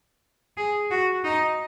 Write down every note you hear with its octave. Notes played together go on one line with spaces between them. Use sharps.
G#4
F#4
D#4